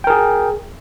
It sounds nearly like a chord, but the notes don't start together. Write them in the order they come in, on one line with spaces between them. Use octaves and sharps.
G5 A#4 G#4